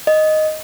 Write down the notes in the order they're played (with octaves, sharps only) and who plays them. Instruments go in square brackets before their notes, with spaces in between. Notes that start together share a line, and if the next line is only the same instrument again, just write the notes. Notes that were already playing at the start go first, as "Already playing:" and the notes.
[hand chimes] D#5